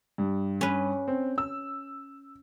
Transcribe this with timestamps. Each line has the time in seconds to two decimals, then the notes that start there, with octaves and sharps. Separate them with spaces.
0.18 G2
0.61 C#4 B4
1.08 C4
1.38 E6